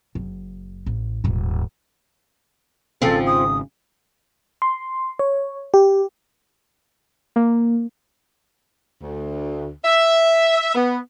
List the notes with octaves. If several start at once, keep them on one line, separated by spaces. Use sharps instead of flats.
F#1
A1
D#1 G#2
G#1 C#3 F3 C4 A4
D#6
C6
C#5
G4
A#3
D2
E5
B3